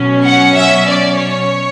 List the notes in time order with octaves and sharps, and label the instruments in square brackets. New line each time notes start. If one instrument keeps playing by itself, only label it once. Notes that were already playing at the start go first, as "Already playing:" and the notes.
Already playing: [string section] B2 F#3 C#4
F#5
E5
D5
C#5